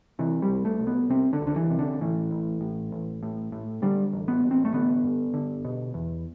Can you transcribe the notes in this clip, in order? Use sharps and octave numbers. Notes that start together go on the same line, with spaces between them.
C3 E3
G3
C2
A3
C2
B3
C3 C4
D3
C2
D3
E3
C3
D3
A2 E3
A1
A2
A1
A2
A2
D3 G3
A1
B3
A1
C4
A3
D3 B3
G2
D3
B2
E2